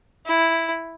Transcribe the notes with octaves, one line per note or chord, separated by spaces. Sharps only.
E4